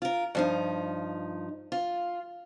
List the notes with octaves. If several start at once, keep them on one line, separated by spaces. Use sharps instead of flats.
F4 A#4
G2 F3 D#4
F4